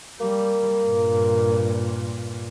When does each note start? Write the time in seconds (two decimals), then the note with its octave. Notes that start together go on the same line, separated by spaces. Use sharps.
0.20 G3 A#3
0.84 G2 A#2